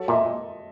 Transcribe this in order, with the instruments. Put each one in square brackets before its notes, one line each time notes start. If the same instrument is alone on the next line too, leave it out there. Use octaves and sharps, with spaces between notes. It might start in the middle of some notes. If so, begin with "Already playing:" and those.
Already playing: [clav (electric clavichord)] F#3 [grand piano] A4
[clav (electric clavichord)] A#2 [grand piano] E5
[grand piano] D#5